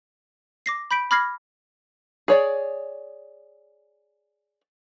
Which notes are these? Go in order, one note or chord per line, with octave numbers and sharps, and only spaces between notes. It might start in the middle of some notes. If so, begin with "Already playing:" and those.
D6 A#6 C7
B5 G6 B6 D7
B5 D6 F6 G#6 A#6 C7
G#4 C#5 D5